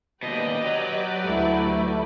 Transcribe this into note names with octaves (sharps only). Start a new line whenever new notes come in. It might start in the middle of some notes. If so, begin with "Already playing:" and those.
D#2 B2 G4 B4 D5 D#5
F#3
D2 A3 E4